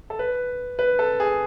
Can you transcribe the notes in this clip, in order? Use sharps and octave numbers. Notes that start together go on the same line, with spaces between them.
A4
B4
B4
A4
G#4